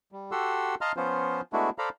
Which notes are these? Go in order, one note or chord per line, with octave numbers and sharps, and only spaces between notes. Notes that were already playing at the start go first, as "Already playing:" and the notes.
G3
F#4 G4 A4 F#5 C6 E6
D#5 F5 A5 A#5 C6 F6
F3 B3 C#4 F4 C5
G#3 A3 B3 D4 E4 F#4
A4 C5 D5 F5 A#5 B5